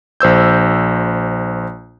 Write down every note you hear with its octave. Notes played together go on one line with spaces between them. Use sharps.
A#1 C5 E6 G6